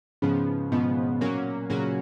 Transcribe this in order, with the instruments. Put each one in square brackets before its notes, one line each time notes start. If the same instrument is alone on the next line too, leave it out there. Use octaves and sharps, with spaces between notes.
[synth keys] G#2 F3 B3 [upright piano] C#3
[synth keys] G#2 F3 B3 [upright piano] B2
[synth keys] A#2 F#3 A#3 C#4 F#4
[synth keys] A#2 F#3 A#3 C#4 F#4 [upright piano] C#3